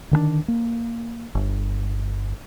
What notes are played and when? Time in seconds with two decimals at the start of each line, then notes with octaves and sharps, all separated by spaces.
0.11 D3 D#3 G3 D4
0.48 A#3
1.35 G1